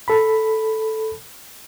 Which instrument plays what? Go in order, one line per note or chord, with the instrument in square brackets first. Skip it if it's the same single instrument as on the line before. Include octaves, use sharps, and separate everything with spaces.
[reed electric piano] A4 B5